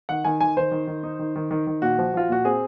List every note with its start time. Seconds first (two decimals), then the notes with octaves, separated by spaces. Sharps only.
0.09 D#3 F#5
0.25 D#3 G#5
0.41 D#3 G#5
0.57 D#3 C5
0.71 D#3
0.87 D#3
1.03 D#4
1.19 D#3
1.36 D#3
1.51 D#3
1.67 D#3
1.82 A#2 F#4
1.99 F3
2.14 F3 F4
2.29 A#2 F#4
2.45 C4 G#4